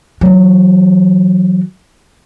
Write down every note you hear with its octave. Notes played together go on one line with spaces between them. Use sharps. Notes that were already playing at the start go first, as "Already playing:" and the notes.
E3 F#3